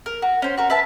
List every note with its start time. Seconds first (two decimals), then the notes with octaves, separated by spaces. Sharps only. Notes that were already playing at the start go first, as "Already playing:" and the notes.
0.06 A#4
0.22 F#4
0.42 C#4 C5
0.57 F#4 A#4
0.70 B4 E5 A5